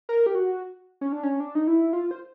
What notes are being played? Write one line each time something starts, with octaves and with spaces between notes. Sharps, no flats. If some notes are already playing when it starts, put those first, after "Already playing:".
A#4
G4
F#4
C#4
D4
C#4
D4
D#4
E4
F4
C5